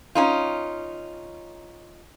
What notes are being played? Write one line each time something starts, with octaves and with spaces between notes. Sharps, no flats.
C#4 D#4 F4